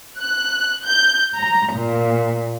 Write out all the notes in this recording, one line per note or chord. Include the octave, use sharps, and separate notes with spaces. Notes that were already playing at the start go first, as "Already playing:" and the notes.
F#6
G6
A#5
A#2